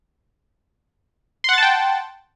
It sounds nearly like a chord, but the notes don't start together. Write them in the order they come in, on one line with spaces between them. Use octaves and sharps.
C6 F#5 A6 A5 G5